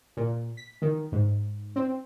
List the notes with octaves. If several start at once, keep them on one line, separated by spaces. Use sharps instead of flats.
A#2
B6
D#3
G#2
C4